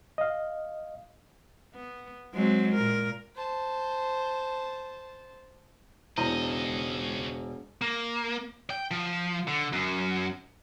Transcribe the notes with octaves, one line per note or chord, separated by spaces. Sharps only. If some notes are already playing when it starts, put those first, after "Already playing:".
D#5 F5
B3
F#3 G#3 C4
A#2 A#4
C5 A5
E1 C#2 D4 E4 C5 D#5
A#3
G5
F3
D3
F#2